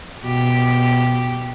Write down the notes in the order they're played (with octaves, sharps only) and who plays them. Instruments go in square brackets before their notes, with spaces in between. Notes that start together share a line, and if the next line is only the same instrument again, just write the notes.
[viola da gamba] B2 G4